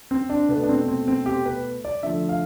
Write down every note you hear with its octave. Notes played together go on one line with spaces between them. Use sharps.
C4
D4
B2 A3 B3
D4
C4
C4
C4
G4
B4
D5
D3 F3 A3 E5
F5